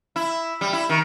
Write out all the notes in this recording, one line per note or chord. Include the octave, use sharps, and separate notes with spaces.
E4
G3
E4
D#3